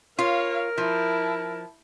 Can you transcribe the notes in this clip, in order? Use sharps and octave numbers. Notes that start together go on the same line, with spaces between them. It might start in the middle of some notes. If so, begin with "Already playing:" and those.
F4 A#4 C#5 F5
F3 E4 A5